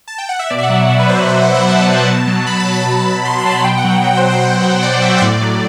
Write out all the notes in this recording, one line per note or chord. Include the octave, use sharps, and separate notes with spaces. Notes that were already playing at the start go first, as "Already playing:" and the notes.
A5
G5
F#5
E5
B2 D5
E5
F#5
F#3
B2 D5
B4
F#3 C5
B4
B2 C5
E5
F#3
F#5
B2 A5
F#3
B2
F#3
B2 B5
A5
F#3
B5
B2
F#3
B2 C6
C6
F#3 A5
B5
B2 G5
F#5
F#3
G5
B2 G5
C5
F#3
C5
B2 C5
F#3 C5
B2 D5
F#3 E5
C5
A2 D5
F#3